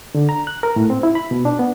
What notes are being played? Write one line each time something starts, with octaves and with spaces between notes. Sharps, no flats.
D3
A#5
F#6
A#4
A2
C4
E4
B5
B2
D4
B3